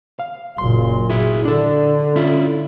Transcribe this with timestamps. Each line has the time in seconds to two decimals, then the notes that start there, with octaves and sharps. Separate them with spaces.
0.19 F5
0.58 F#1 A#2 C6
1.10 E4 F#4 G#4
1.45 D3 D4 A4
2.16 C#4 E4 F4